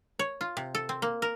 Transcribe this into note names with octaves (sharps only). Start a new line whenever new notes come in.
C#5
F4
C3
A4
C4
A#3
A#4